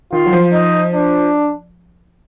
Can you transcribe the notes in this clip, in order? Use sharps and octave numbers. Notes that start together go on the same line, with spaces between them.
D#3 F4
F#3
F3
D#4
D4